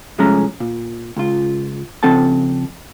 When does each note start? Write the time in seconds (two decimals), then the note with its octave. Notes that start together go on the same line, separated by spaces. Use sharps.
0.18 C2 F3 G#3 A3 C#4 A#5
0.60 A#2
1.16 C#2 F4
2.03 C#3 F3 C4 A4 F#5 A5